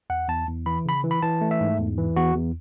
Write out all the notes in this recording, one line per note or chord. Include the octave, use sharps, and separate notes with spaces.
E2 F#5
E2 A5
E2
E3 B5
C#3 B5
E3
B5
E3 A5
A3
E5
G#2
E2
E3
E2 F#4
E2